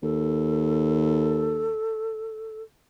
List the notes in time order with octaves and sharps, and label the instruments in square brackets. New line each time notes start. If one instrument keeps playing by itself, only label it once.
[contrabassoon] D#2 [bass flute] A4